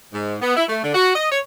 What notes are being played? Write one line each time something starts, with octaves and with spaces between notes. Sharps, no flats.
G#2
B3
E4
A3
D3
F#4
D#5
C#5